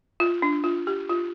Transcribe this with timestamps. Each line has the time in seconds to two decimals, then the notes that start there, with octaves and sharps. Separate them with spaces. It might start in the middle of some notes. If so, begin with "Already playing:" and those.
0.20 F4
0.42 D4
0.64 F4
0.87 G4
1.09 F4